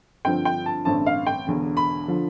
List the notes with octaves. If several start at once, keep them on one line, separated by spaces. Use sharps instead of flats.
G2 D3 F3 C4 G5
G5
A5
A1 G2 D3 A3 C4 A5
F5
G5
E1 E2 D3
B5
D3 F3